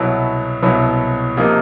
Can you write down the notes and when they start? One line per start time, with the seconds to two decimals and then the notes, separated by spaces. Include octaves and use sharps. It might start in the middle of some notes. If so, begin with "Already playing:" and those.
Already playing: C2 B2 F#3 B3 E4
0.62 C2 B2 F#3 B3 E4
1.37 C3 F3 A#3 D#4